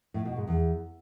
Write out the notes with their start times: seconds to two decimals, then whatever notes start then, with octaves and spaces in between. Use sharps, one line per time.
0.14 A2
0.25 B2
0.36 G#2
0.48 E2